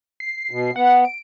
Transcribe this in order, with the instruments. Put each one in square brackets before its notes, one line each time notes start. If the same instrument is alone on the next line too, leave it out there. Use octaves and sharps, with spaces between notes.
[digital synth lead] C7
[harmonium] B2
[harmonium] B3 [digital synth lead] F#5
[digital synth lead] D7